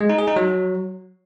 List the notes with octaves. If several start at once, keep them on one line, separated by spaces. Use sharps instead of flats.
G#3
D#4
G#4
D#4
F#3